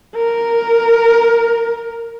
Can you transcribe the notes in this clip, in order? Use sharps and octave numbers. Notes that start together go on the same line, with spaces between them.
A#4